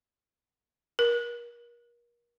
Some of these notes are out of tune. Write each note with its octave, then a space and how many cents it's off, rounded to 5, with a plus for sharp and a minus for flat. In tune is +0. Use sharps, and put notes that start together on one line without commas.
A#4 +35